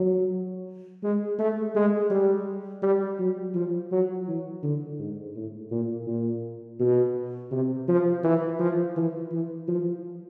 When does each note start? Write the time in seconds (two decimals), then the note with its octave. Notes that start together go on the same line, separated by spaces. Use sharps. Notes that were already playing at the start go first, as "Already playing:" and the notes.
Already playing: F#3
1.03 G#3
1.39 A3
1.75 G#3
2.11 G3
2.83 G3
3.19 F#3
3.55 F3
3.92 F#3
4.28 E3
4.63 D3
4.99 G#2
5.36 A2
5.71 A#2
6.07 A#2
6.79 B2
7.51 C3
7.88 F3
8.24 E3
8.59 F3
8.96 E3
9.32 E3
9.68 F3